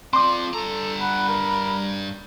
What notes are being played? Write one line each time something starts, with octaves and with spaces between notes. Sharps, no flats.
C4 F4 D5 C6 D6
G2 A4 A#5
F#5 B5
A#4